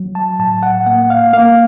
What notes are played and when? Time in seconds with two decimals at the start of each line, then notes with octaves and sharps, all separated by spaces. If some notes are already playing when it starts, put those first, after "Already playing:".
Already playing: F#3
0.15 A5
0.39 A2 A5
0.63 F#5
0.86 A#3 F#5
1.10 F5
1.33 A#3 F5